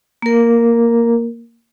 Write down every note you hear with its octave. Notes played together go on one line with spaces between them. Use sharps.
A#3 A#4